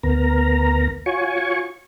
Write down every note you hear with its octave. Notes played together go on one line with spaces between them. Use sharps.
D2 B3 A#4 A#5
F4 F#4 C#5 G#5 C#6